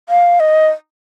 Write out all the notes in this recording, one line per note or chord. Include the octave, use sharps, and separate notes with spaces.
F5
D#5